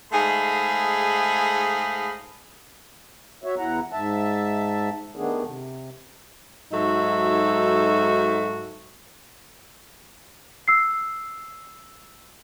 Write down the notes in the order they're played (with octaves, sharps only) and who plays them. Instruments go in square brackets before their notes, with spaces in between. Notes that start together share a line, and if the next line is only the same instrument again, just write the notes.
[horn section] G#2 A3 D#4 G#4 F5 B5
[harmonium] F#4 C#5 E5
E2 E4 F#5 A#5
G#2 E5 A5
D#3 A3 B3 D4 G#4
C3
[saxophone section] G#2 F#3 D#4 F#4 A4 E5
[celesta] E6 C7